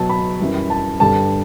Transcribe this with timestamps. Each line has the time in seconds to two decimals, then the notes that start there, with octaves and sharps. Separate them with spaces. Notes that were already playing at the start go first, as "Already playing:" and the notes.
Already playing: B2 F#3 A5
0.09 B5
0.39 F#2 E3 G3
0.70 A5
1.00 G2 D3 G3 A5